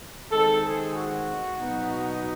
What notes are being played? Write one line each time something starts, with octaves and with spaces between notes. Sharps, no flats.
D#3 G#3 C4 A4
G#4
F#4
B2 F#3 B3 D#4